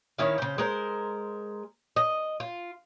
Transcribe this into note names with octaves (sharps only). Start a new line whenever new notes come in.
D#3 C#4 E4 F5
C#3 C5
G#3 A#4 C5
D#5
F4